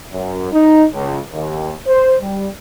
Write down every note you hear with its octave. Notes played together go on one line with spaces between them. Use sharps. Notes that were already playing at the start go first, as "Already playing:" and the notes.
F#2
D#4
C#2
D#2
C5
G3